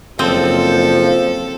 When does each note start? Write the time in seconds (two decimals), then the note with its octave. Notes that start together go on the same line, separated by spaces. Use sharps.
0.19 F#1 F3 C4 A4